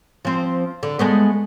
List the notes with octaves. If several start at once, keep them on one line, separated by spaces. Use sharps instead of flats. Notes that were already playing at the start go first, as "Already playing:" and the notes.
F3 C4
D3
G#3 A3 B3